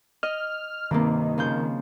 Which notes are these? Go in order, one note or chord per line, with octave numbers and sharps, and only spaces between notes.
D#5 F6
G2 C3 D#3 A#3
C#3 F3 G6